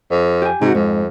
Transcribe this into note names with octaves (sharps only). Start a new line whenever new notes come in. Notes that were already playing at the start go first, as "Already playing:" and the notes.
F2
G4 G#5
G#2 C3 F#4
F2 G#2